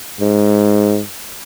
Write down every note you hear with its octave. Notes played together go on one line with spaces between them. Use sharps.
G#2